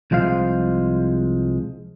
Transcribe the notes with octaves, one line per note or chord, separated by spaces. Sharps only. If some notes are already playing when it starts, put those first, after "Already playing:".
C2 F3 G#3 C5 F5